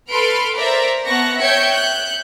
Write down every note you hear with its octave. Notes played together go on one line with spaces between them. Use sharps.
A4 B4 B5 C6 F6 D7
A#4 C5 D5 E5 A#5
B3 A5 C#6 F#6 A#6
C#5 E5 G5 G6 G#6 C#7
F#6 G6